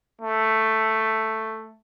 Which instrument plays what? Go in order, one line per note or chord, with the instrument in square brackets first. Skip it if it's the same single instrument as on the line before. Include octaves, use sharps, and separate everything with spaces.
[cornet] A3